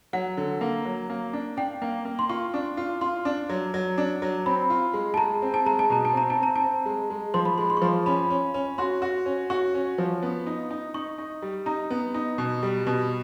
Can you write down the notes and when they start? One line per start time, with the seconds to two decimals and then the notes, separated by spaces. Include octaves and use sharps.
0.13 F#3 F#5
0.37 D3
0.61 A#3
0.85 F#3
1.10 A#3
1.33 D4
1.57 D4 G5
1.82 A#3
2.05 A#3
2.19 C6
2.29 F4 C#6
2.54 D4
2.77 F4
3.01 F4 C6
3.25 D4
3.49 F#3
3.74 F#3
3.98 D4
4.22 F#3
4.46 C4 B5
4.70 F4
4.94 G#3
5.14 A5
5.17 G#3 A#5
5.42 C4
5.54 A5
5.66 G#3 A#5
5.79 A5
5.90 B2 A#5
6.05 A5
6.13 C4 A#5
6.30 A5
6.37 C4
6.43 A#5
6.56 A5
6.62 C4
6.86 G#3
7.10 G#3
7.34 F3 C6
7.45 B5
7.58 G#3 C6
7.70 C6
7.77 C#6
7.82 F3 C6
8.06 C#4 B5
8.30 C#4
8.54 C#4
8.78 F#4 C6
9.02 F#4
9.26 C#4
9.50 F#4 C#6
9.75 C#4
9.98 F3
10.22 B3
10.47 D#4
10.71 D#4
10.94 D#4 C#6
11.18 D#4
11.42 G3
11.66 D#4 A#5
11.90 B3
12.14 D#4
12.38 B2
12.63 G3
12.87 B2